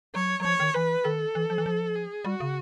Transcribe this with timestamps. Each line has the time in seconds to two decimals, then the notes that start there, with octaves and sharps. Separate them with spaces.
0.15 F#3 C#5
0.40 F#3
0.44 F3 C#5
0.60 D#3
0.74 E3 B4
1.05 D#3 A4
1.35 E3
1.50 F3
1.58 E3
1.66 F3
1.96 G#4
2.25 G3 F#4
2.40 C#3